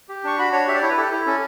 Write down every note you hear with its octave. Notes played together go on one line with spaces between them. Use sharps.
G4
D4 C#6
F#4 B5
D4 C#5
G4 E5
D5
E4 C#5
B4
G4 A4
E4
C#4 A4